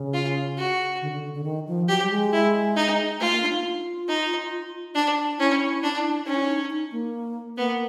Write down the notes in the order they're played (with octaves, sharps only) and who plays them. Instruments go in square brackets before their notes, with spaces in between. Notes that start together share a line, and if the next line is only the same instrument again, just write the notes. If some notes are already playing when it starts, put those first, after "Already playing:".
Already playing: [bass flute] C#3
[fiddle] F4
F#4
[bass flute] D3
D3
D3
D3
D#3
F3
[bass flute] F#3 [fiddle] G4
[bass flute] G3
G#3
[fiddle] E4
D#4
[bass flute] A3 [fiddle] F4
[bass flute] A#3
D4
D#4
F4
[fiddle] D#4
D4
[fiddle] C#4 [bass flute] E4
[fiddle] D4
[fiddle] C#4 [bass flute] D#4
[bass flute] E4
D#4
D#4
A#3
[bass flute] A#3 [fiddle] B3